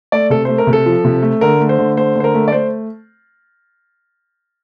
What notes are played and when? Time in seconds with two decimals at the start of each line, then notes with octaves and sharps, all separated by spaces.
0.12 A3 D5
0.30 C3 A4
0.45 A3 C5
0.58 A#4
0.67 C3
0.73 A4
0.86 F3
1.04 C3
1.22 A3
1.41 D3 A#4
1.60 A3
1.69 C5
1.79 D3
1.97 A3 C5
2.16 D3 C5
2.24 A#4
2.35 A3
2.48 D5
2.52 A3 C5